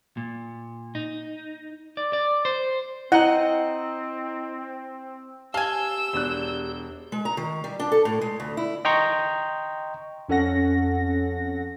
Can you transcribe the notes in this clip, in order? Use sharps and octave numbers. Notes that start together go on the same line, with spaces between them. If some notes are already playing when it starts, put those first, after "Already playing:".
A#2
D#4
D5
D5
C5
C4 E4 D#5 F#5 A#5
G4 F5 G#5 A5 E6
E1 D4 F#6
G#3
A#5
D#3
G3
D4
A4
A2
G#3
D2
E4
D#5 G5 A#5 C6 C#6
F2 C#4 A4 F#5 A#6